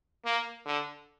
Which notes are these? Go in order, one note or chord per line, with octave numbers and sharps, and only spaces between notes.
A#3
D3